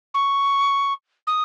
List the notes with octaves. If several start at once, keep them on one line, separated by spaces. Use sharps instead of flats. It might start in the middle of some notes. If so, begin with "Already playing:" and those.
C#6
D#6